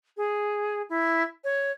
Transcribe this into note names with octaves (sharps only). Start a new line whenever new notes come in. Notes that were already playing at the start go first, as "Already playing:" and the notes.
G#4
E4
C#5